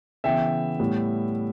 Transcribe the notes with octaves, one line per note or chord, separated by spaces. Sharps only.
C#3 E3 B3 E5 G5
A2 G3 B3